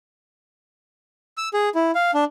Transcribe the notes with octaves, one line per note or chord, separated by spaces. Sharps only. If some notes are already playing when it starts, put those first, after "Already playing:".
E6
G#4
E4
F5
D4